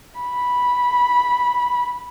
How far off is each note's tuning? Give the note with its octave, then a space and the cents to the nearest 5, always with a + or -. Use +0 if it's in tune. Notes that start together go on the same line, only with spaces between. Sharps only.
B5 -10